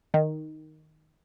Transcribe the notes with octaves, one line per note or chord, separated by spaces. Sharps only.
D#3